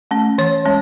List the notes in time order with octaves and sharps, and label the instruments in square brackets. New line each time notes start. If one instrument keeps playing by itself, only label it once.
[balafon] A3 C#4
E3 C#5
G#3 C#4